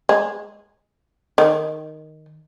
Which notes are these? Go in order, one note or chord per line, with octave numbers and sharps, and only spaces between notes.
G#3
D#3